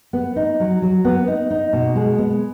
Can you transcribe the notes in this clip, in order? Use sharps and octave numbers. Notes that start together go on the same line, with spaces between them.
B3
D#4
F#3
F#3
B3
D#4
D#4
B2
G#3
B3